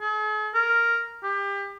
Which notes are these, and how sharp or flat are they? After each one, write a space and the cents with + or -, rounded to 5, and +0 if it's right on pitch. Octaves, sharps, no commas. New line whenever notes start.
G#4 +45
A#4 +0
G4 +30